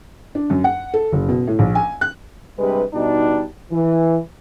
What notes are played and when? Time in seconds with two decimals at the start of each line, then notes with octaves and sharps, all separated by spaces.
0.35 D4
0.50 F#2
0.64 F#5
0.94 A4
1.12 F#1
1.29 B2
1.47 A2
1.59 A#1
1.75 G#5
2.01 F#6
2.59 G2 C3 G3 G#3 B4
2.93 B2 G3 D4 D#4
3.72 E3